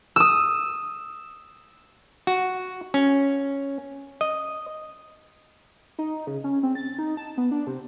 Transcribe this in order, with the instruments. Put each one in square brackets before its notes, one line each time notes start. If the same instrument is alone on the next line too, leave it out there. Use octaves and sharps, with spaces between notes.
[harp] D#6 E6
[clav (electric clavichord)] F#4
C#4
D#5
[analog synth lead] D#4
C#3
C#4
C4
A6
D#4
A5
B3
D4
C3